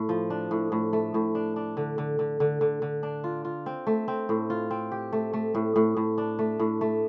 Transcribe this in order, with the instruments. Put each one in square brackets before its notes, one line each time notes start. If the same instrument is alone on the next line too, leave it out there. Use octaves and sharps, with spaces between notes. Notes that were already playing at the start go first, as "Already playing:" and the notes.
Already playing: [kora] A2
F3
D4
A2
A2
A3
A2
D4
D4
D3
D3
D3
D3
D3
D3
D4
F4
F4
C4
A3
C4
A2
F4
C4
G4
A3
A3
A2
A2
A2
D4
A3
A2
A3